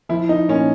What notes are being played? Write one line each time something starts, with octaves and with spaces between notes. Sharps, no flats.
F3 E4
D#4
A#2 C#4